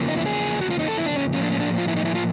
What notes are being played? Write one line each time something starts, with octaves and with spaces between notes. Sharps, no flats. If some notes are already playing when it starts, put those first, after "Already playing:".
Already playing: E2 C#3 F3 A#3
D#4
E4
G#4
F#4
F4
D#4
A4
E4
D4
C#4
A2 F3 A#3 C#4
D4
C#4
D4
F4
E4
D#4
E4
F4